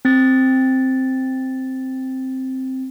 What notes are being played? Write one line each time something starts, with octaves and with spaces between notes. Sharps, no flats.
C4 A6